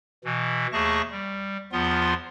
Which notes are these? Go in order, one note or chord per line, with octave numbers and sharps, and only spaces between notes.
B2 E3
D#2 A3 G#4 A5 C#6 A#6
G3
E2 F3 B3 F4 C6